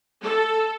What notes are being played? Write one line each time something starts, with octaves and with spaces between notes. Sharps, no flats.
A4